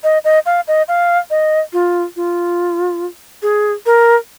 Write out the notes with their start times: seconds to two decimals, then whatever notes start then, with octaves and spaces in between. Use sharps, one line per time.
0.04 D#5
0.25 D#5
0.46 F5
0.68 D#5
0.88 F5
1.30 D#5
1.73 F4
2.16 F4
3.42 G#4
3.86 A#4